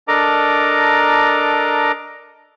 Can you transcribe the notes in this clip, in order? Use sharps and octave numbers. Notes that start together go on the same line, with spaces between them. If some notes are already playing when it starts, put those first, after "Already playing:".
D4 A4 A#4 D#5 A#5 D6